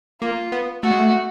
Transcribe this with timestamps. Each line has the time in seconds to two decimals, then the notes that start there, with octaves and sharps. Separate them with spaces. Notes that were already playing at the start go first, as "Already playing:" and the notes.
0.22 A#3 F4
0.52 B3
0.83 A3 F#4
0.91 G#3
0.99 A3